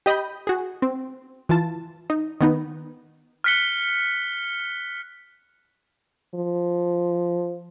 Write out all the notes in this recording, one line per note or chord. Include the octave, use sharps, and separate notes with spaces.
G4 D#5 B5 G6
F#4 G#4
C4
E3 F4 A5
D#4
D#3 B3 D#4
F6 F#6 B6 C#7 G7
F3